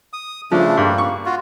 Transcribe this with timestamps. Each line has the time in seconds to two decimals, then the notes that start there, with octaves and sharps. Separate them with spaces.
0.13 D#6
0.52 C#3 F3 A3 D4
0.77 G2 A#3
0.98 C#6
1.26 F4 F#4